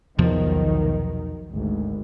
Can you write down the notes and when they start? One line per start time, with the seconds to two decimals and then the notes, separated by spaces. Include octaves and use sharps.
0.19 B1 E2 C3 D#3 F3
1.50 G#1 D2